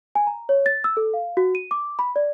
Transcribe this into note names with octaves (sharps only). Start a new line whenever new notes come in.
G#5
A#5
C#5
A6
E6
A4
F5
F#4
D#7
D6
B5
D5